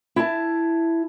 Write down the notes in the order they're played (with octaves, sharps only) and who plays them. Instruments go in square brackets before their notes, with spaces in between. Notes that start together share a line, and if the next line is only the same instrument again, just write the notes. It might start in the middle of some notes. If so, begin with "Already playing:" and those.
[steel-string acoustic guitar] E4 A5